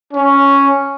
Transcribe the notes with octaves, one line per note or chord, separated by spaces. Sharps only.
C#4